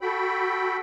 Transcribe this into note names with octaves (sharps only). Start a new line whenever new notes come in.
F#4 A4 G5 B5